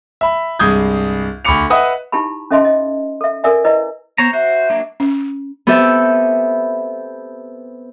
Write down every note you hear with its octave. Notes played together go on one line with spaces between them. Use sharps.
E5 B5
C2 G2 G#3 D#6 G6 G#6
D2 B5 C#6 D6 C#7 F7
B4 D#5 E5 F#5 D#6
D#4 E4 G4 A5 B5
C#4 A4 D#5 E5 A5 C6
D#5
A4 E5
A4 A#4 D5 E5 G#5
E4 B4 D5 D#5
B3 C5 C#5 A#5
F#4 C5 E5
F#3 A#3 D4
C#4
B3 C4 G4 A4 E5